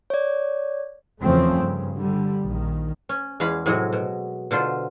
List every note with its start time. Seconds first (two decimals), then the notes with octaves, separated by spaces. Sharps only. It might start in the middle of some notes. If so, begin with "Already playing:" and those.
0.10 C#5 D5
1.22 E2 C#3 F3 A3 C4 C#4
1.55 G2 C#3
1.96 D3 G3
2.44 A#1 D#3
3.09 C#4
3.40 E2 G#3 C#4 F5 B5
3.66 A2 C3 F#3 G#3
3.93 B2
4.51 B2 D3 F4 C5